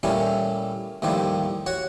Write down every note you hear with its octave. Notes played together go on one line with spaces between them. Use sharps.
A#2 G3 A3 C#4 E4
D#2 A2 F3 G3 E4
F#4 C#5 F#5